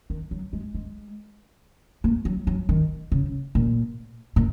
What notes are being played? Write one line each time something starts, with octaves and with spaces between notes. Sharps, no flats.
D#3
F#3
G#3
G#3
A#3
F#3
F#3
D#3
C#3
A#2
A#2